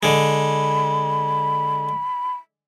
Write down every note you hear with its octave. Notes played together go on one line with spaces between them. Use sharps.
D3 G#3 B5